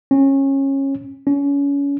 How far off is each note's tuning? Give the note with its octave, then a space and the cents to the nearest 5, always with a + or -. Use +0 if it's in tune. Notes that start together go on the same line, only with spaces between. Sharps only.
C#4 -20
C#4 +30